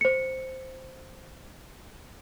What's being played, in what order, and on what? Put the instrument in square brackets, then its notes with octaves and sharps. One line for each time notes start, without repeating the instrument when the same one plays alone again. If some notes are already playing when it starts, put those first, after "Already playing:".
[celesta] C5 C#7